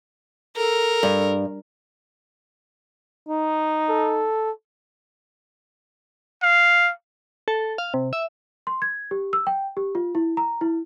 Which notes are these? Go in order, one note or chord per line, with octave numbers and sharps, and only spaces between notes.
A4 A#4
G2
D#4
A4
F5
A4
F5
C3
E5
C6
G#6
G4
E6
G5
G4
F4
E4
A#5
E4